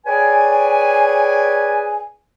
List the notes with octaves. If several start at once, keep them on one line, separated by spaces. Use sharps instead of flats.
G#4 B4 C#5 D5 G5 G#5